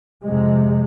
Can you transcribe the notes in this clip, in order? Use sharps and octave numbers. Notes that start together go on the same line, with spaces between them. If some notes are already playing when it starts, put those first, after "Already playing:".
F2 C3 G#3